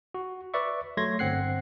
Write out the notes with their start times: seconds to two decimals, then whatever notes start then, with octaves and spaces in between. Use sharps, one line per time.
0.14 F#4
0.54 B4 D5 E5 C#6
0.97 F#3 A3 C6 G#6 A#6
1.19 G1 C4 F#5 F#6 C7